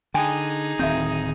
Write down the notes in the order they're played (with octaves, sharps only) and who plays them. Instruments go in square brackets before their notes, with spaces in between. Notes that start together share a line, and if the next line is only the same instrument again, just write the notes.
[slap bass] D3 [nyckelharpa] D#4 G#4 [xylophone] G5 G#5
[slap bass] D1 D#3 C4 [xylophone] E5 F5 G6